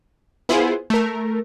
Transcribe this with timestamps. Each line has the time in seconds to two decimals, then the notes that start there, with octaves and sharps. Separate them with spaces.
0.49 B3 E4 F4 G#4 C5
0.90 A3 A#4